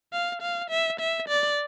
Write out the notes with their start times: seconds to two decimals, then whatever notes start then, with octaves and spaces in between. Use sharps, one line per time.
0.13 F5
0.42 F5
0.70 E5
1.00 E5
1.29 D5